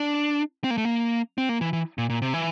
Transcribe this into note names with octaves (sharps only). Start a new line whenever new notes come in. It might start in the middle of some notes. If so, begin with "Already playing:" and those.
Already playing: D4
C4
A#3
A3
A#3
C4
A#3
E3
E3
A#2
A#2
C3
E3